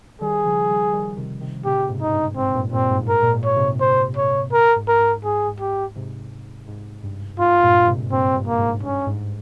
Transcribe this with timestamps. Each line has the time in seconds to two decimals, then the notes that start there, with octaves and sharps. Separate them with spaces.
0.21 D#3 G3 G#4
0.45 C#3 F3
0.69 D#3 G3
0.93 D#3 G3
1.17 C3 D#3
1.41 C3 D#3
1.65 A#2 C#3 G4
1.89 G#2 C3
2.01 D#4
2.12 G2
2.36 G#2 C4
2.54 G2 A#2
2.72 G2 A#2 C4
2.84 G2
2.91 G#2
3.08 G#2 A#4
3.23 A#2
3.32 G#2
3.44 C#5
3.56 G#2 C3
3.80 C5
4.17 C#5
4.52 A#4
4.76 G#2
4.88 A#4
5.00 G#2
5.24 G#2 G#4
5.48 G#2
5.60 G4
5.96 G#2 C3
6.68 G#2
7.03 G2
7.39 G#2 F4
7.63 G2 A#2
7.80 A#2
7.87 G#2 C3
8.12 G2 A#2 C4
8.35 G2
8.47 A#3
8.59 G#2
8.83 G2 C#4
9.06 G#2